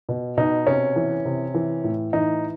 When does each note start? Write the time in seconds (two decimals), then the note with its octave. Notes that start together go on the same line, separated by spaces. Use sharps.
0.09 B2
0.37 B2 D#4
0.67 C3 C#4
0.96 E3
1.25 C3
1.55 E3
1.84 A2
2.13 E3 D#4